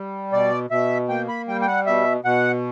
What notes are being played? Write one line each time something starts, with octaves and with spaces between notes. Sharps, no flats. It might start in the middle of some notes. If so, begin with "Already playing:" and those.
Already playing: G3
B2 D5
B2 E5
A#3 G5
B5
G3 G5
G5
F#5
B2 E5
B2 F#5